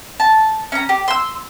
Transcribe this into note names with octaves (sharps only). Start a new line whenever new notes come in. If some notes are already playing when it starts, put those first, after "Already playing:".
A5
C#4 A#5
G4
C6 E6